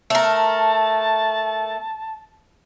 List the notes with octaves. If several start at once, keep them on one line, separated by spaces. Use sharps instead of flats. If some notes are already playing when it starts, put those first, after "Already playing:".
A3 A#4 A5